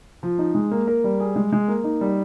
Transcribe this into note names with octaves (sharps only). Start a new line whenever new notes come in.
F3
D#4
G#3
A#3
A#4
G3
G#4
G#3
G#3
A#3
D#4
G3